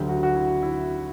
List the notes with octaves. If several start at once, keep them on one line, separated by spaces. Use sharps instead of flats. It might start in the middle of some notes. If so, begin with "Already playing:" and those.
Already playing: D2 D3 F#3 G4
F#4
F#4
E4
E4